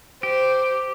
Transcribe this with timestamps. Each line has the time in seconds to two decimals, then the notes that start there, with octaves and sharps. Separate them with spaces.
0.23 G4 C5